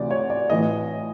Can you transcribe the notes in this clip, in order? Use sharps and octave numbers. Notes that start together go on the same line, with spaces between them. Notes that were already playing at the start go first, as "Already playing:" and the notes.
Already playing: D2 C3 E3 D5
C#5
D5
A1 A2 E3 D#5